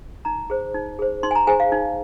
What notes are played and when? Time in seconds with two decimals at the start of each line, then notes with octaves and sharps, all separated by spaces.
0.25 D#4 A#5
0.50 G#4 C5
0.74 D#4
0.99 G#4 C5
1.23 D#4 C6
1.31 G#5
1.35 A#5
1.47 G#4 C5 G#5
1.60 F5
1.72 D#4